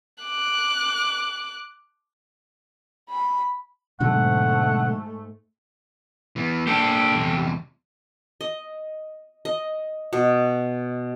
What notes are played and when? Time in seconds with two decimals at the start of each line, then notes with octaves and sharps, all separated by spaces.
0.24 D6 F#6
3.09 B5
4.00 G#2 B2 D3 F#3 A3 F#5
6.36 E3 B3
6.67 A#3 D4 G4 A4
7.15 E2 C3
8.41 D#5
9.45 D#5
10.13 B2